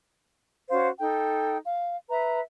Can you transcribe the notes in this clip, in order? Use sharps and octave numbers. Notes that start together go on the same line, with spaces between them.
C#4 F#4 C5 F5
D#4 A4 G5
F5
B4 E5 A#5